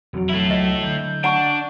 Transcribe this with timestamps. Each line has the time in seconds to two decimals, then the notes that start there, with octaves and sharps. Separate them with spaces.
0.13 E1 F2 C#3 F#3
0.30 A3 E4
0.51 C#2 D#5
0.83 D3 F#3 G6
1.24 D4 F#5 A5 C#6